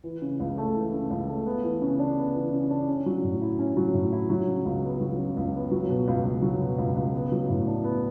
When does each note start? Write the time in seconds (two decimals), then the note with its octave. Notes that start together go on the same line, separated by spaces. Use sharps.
0.04 E3
0.22 C#3
0.40 C#2
0.58 A3
0.75 E3
0.93 C#3
1.11 C#2
1.28 A3
1.46 B3
1.64 E3
1.82 C#3
1.99 D4
2.17 B3
2.35 E3
2.53 C#3
2.70 D4
2.88 C#4
3.06 F#3
3.24 A2
3.42 E4
3.59 C#4
3.77 F#3
3.94 A2
4.12 E4
4.30 F#3
4.48 C#3
4.65 C#2
4.83 B3
5.01 F#3
5.18 C#3
5.37 C#2
5.54 B3
5.71 F#3
5.89 B2
6.08 C#2
6.25 C#2
6.42 F#3
6.61 B2
6.78 C#2
6.96 C#2
7.14 B3
7.32 F#3
7.49 A2
7.67 D4
7.84 B3